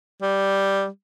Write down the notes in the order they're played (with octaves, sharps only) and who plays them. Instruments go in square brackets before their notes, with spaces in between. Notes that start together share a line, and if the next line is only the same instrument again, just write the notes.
[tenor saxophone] G3